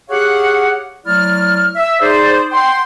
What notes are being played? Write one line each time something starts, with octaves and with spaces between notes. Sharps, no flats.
G4 G#4 C#5 F5 F#5
F#3 A3 E4 D5 F6
E5
D#4 G#4 C5 D5
F#5 G5 C6